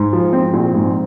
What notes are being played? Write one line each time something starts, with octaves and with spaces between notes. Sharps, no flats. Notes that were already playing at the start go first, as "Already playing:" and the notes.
Already playing: G#2
F3
C4
A#1
G#2